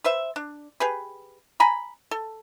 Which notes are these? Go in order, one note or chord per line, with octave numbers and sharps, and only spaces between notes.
B4 C5 E5
D4
G4 G#4 B4
G#5 A#5 B5
A4